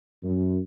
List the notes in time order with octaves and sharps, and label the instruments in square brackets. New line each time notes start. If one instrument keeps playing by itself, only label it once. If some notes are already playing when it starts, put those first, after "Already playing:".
[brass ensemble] F#2